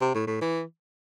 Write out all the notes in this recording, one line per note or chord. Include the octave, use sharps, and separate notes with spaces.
C3
A2
A2
E3